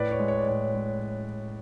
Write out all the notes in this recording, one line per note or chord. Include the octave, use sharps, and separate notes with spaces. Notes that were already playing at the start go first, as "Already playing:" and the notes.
Already playing: A2 B4 D5
C#5
G#3
C#5
D5
A2 C#5
G#3